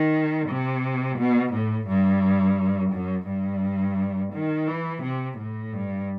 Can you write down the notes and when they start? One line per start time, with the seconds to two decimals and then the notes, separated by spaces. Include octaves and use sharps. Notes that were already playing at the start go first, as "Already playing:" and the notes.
Already playing: D#3
0.48 C3
1.18 B2
1.53 A2
1.88 G2
2.93 F#2
3.28 G2
4.33 D#3
4.68 E3
5.03 C3
5.38 A2
5.73 G2